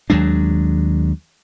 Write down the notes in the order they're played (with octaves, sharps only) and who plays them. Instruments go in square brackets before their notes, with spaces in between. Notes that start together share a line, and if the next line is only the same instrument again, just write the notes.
[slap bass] D#2 F#3 G#3 D4